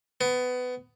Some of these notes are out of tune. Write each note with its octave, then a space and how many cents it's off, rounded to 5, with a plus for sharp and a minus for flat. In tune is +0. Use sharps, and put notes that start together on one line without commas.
B3 +20